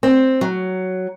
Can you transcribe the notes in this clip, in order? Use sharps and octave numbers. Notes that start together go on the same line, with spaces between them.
C4
F#3